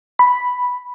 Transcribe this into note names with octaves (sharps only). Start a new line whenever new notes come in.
B5